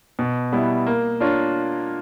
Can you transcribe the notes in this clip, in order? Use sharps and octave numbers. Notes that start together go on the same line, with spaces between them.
B2
G3 B3 E4
A#3
D4 F4 A#4 C#5